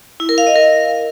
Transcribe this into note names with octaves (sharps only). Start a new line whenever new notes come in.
E4
A#4
F5
D#5
A#4